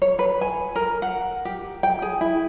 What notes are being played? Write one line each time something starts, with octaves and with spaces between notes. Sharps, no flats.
C#5
B4
G#5
A#4
F#5
G4
G5
G#4
E4